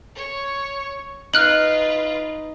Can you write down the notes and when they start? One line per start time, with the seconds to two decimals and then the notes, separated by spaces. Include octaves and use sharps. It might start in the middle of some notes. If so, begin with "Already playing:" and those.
0.16 C#5
1.34 D#4 F4 B4 F6 F#6 F#7